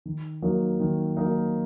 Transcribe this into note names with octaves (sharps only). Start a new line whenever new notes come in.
D#3
F#3 A#3 D#4
D#3
F#3 A#3 D#4